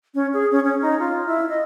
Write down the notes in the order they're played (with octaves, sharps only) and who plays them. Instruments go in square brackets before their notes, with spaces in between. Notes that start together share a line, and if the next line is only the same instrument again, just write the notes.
[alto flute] C#4
G#4
C#4
C#4
D#4
F4
E4
D#5